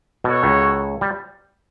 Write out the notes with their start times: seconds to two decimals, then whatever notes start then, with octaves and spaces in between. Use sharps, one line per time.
0.24 B2 F#4 A4 C#5
0.43 C#2 C#3
1.01 G3